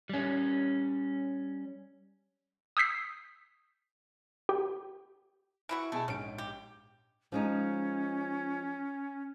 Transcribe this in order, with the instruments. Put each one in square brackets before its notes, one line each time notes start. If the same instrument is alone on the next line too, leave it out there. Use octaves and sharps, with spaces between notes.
[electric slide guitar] G3 C#4
[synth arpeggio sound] D#6 E6 G6 B6 C7
G4
[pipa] E3 E4 F#4 [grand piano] D7
[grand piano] B2 G#4 A5 [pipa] A3
[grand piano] A#1 G#2 D7 [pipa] C#4
[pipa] G4
[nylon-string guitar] F3 G#3 D#4 [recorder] C#4